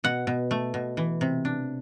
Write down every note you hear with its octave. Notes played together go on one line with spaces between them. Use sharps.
B2 F#5
B2
A3
B2
E3
C3
D4